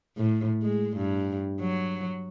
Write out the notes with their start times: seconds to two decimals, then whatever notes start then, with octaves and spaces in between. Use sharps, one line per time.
0.17 A2
0.63 G#3
0.97 G2
1.60 F#3